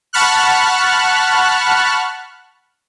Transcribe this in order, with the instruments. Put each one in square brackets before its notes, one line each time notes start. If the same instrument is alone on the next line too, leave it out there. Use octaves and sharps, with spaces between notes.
[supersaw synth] F#5 A5 B5 C#6 F6 F#6